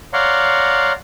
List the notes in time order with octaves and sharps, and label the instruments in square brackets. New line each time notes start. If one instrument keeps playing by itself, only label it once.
[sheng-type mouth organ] C#5 D5 F5 F#5 A#5 C6